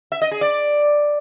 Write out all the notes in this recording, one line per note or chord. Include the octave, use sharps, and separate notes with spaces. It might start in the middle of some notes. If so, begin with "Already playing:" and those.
E5
D#5
G#4
D5